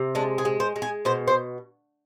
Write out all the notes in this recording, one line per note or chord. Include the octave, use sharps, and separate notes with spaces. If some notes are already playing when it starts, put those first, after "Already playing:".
Already playing: C3
G#3 D4
G#4
G#3
C5
G#3
G#4
B2 C5
C5